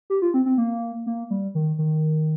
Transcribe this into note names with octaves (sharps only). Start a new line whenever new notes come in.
G4
F4
C4
C4
A#3
A#3
G3
D#3
D#3